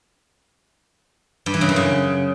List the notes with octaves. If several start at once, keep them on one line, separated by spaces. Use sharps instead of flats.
G2
E3
C#3
F#2
C#3